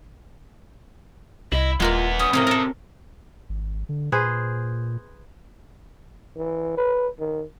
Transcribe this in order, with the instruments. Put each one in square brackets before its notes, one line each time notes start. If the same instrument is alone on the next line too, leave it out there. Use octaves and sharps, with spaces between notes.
[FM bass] C2 [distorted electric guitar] E4 [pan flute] D#5
[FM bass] D#1 [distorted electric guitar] E3 B3 [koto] G#3 A#3 D5 [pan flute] F4
[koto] C#4 [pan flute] D#6
[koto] A2 A#3 C#4 [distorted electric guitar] C3 [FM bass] C4
[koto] A4 A#4
[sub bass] G#1
D3
[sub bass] A#2 [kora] G#4 B4 C5
[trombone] E3
B4
D#3